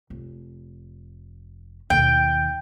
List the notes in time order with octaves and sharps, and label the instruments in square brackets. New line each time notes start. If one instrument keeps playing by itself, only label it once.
[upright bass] F1
[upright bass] D#2 B2 [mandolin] G5